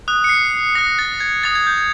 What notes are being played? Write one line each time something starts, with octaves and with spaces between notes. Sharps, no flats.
D#6 F#6
C#7
C7
D#6 F#6 A#6
A6
G#6
D#6 F#6 A6
G#6
G6
G#6